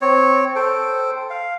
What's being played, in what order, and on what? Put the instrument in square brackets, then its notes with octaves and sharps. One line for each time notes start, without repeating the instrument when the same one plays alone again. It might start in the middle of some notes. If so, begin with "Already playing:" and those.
[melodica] C4 C#5
A4 C5 G5
F5